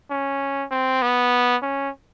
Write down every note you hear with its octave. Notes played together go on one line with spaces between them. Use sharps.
C#4
C4
B3
C#4